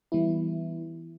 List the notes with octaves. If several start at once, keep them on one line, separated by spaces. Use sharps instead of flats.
E3 G3 B3 E4